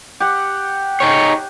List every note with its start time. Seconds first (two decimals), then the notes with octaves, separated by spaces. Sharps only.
0.20 G4 F#5
1.00 D#4 G#4 C#5